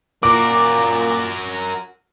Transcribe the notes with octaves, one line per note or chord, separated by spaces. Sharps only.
A#2 F#4 A#4 D6